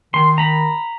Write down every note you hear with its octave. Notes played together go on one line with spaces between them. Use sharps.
D#3 C6
A#5 B5